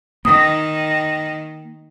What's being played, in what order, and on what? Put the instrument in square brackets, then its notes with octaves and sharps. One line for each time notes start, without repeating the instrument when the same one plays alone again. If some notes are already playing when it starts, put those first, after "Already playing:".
[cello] D#3 [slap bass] A#3 [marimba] D#6